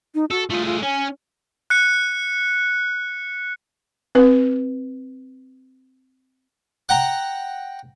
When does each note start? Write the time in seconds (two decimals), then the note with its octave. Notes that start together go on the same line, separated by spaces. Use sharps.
0.15 D#4
0.31 F#4 A4
0.50 A3 F4 G#4
0.66 F4
0.83 C#4 G#5
1.70 F#6 C#7
4.15 C4 B4
6.89 F#5 G5 A#5